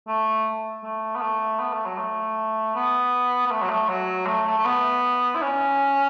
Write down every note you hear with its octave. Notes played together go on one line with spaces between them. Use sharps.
A3
A3
B3
A3
B3
A3
F#3
A3
B3
B3
A3
F#3
A3
F#3
A3
A3
A3
B3
E4
C#4